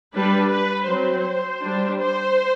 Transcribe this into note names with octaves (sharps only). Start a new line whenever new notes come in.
G3 D4 B4
B4
F#3 C4 C5
G3 D4
C5